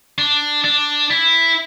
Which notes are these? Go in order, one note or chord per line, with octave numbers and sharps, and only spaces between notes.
D4
D4
E4